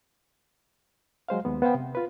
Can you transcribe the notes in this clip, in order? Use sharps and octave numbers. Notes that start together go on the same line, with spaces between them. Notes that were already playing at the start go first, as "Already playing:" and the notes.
F#3 G#3 C5 F5
D#2 G#3 B3
B3 C5 F5 G5
C3
F4 B4